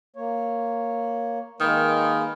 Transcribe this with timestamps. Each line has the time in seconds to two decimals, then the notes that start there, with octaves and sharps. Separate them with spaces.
0.16 A#3 C#5
1.61 D#3 G#3 A#3 B4